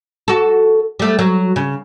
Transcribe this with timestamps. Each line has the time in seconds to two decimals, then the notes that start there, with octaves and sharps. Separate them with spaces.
0.28 F#4 A4
1.00 G3 A3
1.19 F#3
1.56 C#3